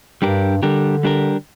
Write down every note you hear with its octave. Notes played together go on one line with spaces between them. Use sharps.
G2 G3 D4 G4 A#4
D3 G3 D4 G4 A#4
G3 D4 G4 A#4